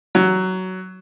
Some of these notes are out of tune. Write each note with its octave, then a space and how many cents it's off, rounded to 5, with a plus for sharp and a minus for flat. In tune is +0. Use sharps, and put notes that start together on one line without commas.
F#3 +10